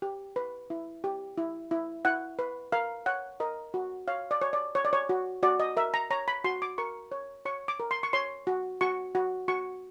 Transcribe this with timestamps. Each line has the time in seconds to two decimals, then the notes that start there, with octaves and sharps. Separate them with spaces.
0.02 G4
0.36 B4
0.70 E4
1.04 G4
1.38 E4
1.71 E4
2.05 E4 F#5
2.39 B4
2.72 A#4 F5
3.06 C#5 F#5
3.40 A#4 D#5
3.74 F#4
4.08 C#5 F5
4.31 D5
4.42 C#5
4.53 D5
4.75 C#5
4.85 D5
4.93 C#5
5.09 F#4
5.43 F#4 D5
5.60 D#5
5.77 A#4 E5
5.94 A#5
6.10 C#5 A#5
6.28 B5
6.44 F#4 C6
6.62 D6
6.78 A#4 C#6
7.12 C#5
7.45 C#5 C#6
7.68 D6
7.80 A#4
7.91 C6
8.03 C#6
8.13 C#5 C6
8.47 F#4
8.81 F#4 C#6
9.15 F#4
9.48 F#4 C#6